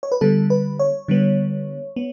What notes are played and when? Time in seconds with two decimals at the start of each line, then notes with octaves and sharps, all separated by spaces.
0.03 C#5
0.12 B4
0.21 D3 G3 B3 A4
0.50 B4
0.79 C#5
1.08 D3 G3 B3
1.96 B3